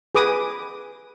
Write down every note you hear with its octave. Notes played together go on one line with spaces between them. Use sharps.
G#4 B4 D6 D#6